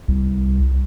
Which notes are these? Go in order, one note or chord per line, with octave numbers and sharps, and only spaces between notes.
C2